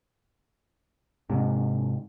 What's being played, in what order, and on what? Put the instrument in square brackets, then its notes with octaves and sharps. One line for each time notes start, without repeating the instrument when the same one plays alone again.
[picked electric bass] G#2 C3